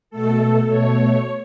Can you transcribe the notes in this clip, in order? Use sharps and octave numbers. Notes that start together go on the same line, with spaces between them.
B2 A3 A4
B2 A3 C#5